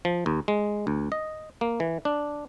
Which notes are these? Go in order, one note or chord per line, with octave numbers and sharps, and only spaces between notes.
F3
D#2
G#3
D2
D#5
A#3
E3
D4